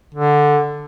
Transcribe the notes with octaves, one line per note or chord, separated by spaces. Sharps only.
D3